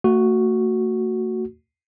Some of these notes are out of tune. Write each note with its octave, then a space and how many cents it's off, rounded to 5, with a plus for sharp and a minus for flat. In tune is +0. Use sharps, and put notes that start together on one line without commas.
A3 +40 F#4 +0